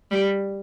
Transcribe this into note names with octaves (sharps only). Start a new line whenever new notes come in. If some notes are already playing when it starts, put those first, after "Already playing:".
G3